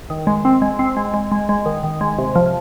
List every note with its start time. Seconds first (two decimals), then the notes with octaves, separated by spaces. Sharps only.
0.10 D#3
0.27 G#3
0.45 C4
0.62 G#3
0.79 C4
0.97 G#3
1.14 G#3
1.32 G#3
1.49 G#3
1.66 D#3
1.83 D#3
2.01 G#3
2.18 C3
2.36 F3